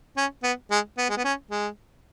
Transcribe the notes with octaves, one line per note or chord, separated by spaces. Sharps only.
C#4
B3
G#3
B3
G#3
B3
C#4
G#3